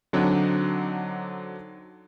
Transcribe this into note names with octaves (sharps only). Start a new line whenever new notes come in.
D3 F#3 C4 D4 D#4